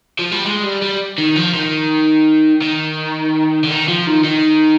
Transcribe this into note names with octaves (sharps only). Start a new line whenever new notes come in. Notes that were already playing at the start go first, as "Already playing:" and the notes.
F3
G3
G#3
G3
G3
D#3
F3
D#3
D#3
D3
D#3
F3
D#3
D#3